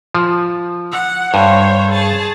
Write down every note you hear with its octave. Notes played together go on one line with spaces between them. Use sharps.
F3
F#5
G2 C5 C#5
G#4 A5